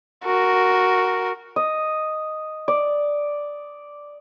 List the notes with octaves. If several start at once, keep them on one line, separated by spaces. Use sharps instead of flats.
F#4 A#4
D#5
D5